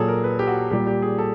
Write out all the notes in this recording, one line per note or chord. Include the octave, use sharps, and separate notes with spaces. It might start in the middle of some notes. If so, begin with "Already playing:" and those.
Already playing: A#2 F#3 G#4 A4
A#4
B4
G4
F#4
A#2 G3 G4
G4
G#4
A4